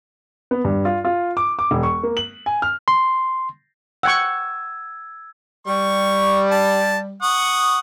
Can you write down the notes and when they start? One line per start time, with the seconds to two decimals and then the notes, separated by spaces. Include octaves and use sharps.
0.51 B3
0.65 G2
0.85 F4
1.05 F4
1.37 D6
1.59 D6
1.71 E1
1.83 C#6
2.03 A#3
2.17 F#7
2.46 G#5
2.62 F6
2.88 C6
4.03 F#5 G5 C#6 E6 G#6
5.67 G3 C#6
6.51 A5
7.22 F#5 C#6 D#6